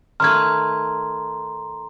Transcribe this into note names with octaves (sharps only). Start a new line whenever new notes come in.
D#3 A3 B4 A#5 C6 F6 G#6